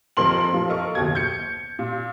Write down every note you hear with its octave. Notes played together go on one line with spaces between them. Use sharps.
F2 F3 A#4 C6 F#7
A#2 F3
A4 A#4 D#5 F5 C#6
F#1 D#2 B2 G#6
G6 C#7
A#2